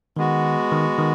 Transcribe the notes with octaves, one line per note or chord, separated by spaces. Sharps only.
D#3 G#3 B3 F#4
D#3
D#3